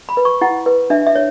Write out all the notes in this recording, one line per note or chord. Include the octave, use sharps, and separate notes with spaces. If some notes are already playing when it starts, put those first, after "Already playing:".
B5
B4
C#6
E4 F#5
B4
D4 E5
E5
C#5